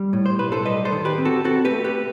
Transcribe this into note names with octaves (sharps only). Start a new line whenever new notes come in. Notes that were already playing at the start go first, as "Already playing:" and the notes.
Already playing: G3
A2
C5
B1 B4
A4 C5
G3 B4 D#5
A4 C5
D#3
G4 B4
C4
F#4 A4
C4 F#4 A4
G4 B4
A3
G4 B4